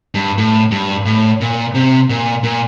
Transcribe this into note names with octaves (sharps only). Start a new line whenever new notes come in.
G2
A2
G2
A2
A#2
C3
A#2
A#2